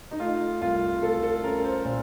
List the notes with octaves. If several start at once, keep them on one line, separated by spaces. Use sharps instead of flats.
D#4
A3 F4
C2 F4
A3 A4
A4
C#4 A#4
C5
A#2